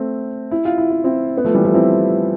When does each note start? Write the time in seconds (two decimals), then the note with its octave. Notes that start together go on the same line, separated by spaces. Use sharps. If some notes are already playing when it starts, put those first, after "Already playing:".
Already playing: A3 C4
0.51 E4
0.65 F4
0.78 E4
0.90 F4
1.04 C4 E4
1.37 B3
1.44 F3 A3
1.54 E3 G3
1.65 F3 A3
1.74 C4 E4